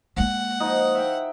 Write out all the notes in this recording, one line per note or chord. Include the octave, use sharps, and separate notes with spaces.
G#3 A#3 F#5
F3 D#4 D#5
E5 G5